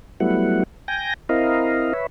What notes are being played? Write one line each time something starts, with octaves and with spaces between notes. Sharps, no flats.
F#3 G3 A3 B3 E4 F#5
G5 G#5 G6 A#6
C4 E4 A#4 D#5 F5
B4 C#5 E5